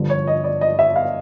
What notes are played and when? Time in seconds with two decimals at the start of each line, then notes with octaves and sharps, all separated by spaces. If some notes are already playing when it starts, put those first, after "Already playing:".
Already playing: G1 G2 D3 F3
0.10 C#5
0.27 D#5
0.44 D5
0.61 D#5
0.79 E5
0.96 F5